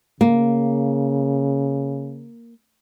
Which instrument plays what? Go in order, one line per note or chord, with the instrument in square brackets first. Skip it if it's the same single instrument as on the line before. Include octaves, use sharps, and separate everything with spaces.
[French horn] C#3 [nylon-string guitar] A#3